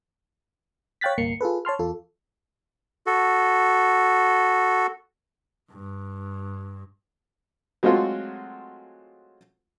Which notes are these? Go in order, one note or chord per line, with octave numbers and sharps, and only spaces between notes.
C#5 F5 G5 F#6 A6 B6
G1 C2 A#3 C7 C#7
F4 G#4 A4 B4
C#5 A5 C6 F6
E2 F4 A4
F#4 A4
G2
F#3 G#3 A3 C4 F4 F#4